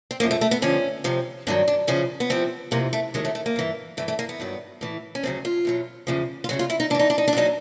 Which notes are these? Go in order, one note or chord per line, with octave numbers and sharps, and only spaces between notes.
C4
F#2 D3 F3 A#3
A3
A3
B3
F2 D3 F3 C#4
F2 C3 F3
G2 D#3 F#3 D4
D4
E2 C#3 F3 C#4
B3
E2 C3 F3 C4
F2 C3 E3 A#3
A3
D#2 D#3 F#3 G#3
A3
A3
A#3
G2 E3
G2 E3 A3
A3
A#3
B3
G2 D#3 F#3
A2 E3
C#4
D2 C#3 F#3 C4
F4
E2 B2 F#3
E2 C#3 F3
F4
D2 C#3 F#3 F#4
F4
E4
D#4
G#2 E3 D4 D#4
D4
D#4
D4
D#2 C#3 F#3 D#4